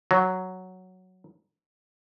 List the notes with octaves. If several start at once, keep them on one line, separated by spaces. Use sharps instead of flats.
F#3